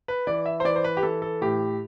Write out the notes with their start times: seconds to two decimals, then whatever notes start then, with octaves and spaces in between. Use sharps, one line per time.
0.08 B4
0.27 E3 D5
0.46 E5
0.60 C5
0.65 E3 D5
0.76 C5
0.84 B4
0.97 G4
1.03 E3 A4
1.22 A4
1.41 A2 G4